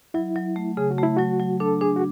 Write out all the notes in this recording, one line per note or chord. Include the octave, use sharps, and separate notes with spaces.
F#3 E4
F#3
A3
C#3 G#4
F#4
A3 E4
F#3 F#4
F#3
D4 A4
D4 G#4
F#4